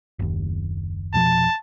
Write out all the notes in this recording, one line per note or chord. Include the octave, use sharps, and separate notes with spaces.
F#1 D#2
F1 B2 F3 A5